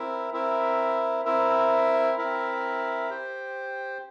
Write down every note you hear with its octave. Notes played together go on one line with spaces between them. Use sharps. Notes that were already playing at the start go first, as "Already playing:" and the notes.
Already playing: C4 E4 A#4 E5
C4 E4 A#4 E5
C4 E4 A#4 E5
C4 E4 A#4 E5
G4 C5 G5